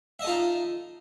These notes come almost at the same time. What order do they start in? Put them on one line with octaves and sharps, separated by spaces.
E5 D#5 A4 F4 D#4